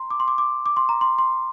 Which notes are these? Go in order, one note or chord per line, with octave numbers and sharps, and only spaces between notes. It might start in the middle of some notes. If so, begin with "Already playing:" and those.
Already playing: A#5 C6
D6
C6
D6
D6
D6
C6
A#5
C6
C6